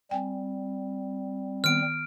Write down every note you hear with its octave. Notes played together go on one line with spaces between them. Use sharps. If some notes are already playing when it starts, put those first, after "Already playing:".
G3 C4 G5 G#5
D#3 B3 F6 D7